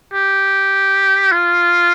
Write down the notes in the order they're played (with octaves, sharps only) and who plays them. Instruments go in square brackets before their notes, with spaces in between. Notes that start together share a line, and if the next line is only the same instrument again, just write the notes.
[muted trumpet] G4
F4